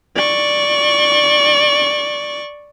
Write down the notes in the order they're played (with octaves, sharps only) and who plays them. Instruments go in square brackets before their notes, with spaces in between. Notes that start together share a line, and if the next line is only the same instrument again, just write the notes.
[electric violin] D5 C#6